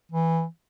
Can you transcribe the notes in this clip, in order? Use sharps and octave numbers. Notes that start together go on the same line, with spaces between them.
E3